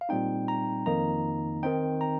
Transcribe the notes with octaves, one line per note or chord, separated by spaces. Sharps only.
F5
A#2 G3 C4 D#4 G5
A#5
F2 D#3 A#3 D#4 A#5
D#3 C4 D#4 G5
A#5